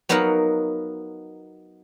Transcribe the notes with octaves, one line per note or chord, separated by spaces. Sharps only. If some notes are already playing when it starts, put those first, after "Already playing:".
F#3 B3 D#4 A#4 F5 F#5